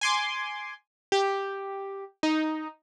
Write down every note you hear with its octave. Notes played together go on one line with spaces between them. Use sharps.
G#5 C6 D6
G4
D#4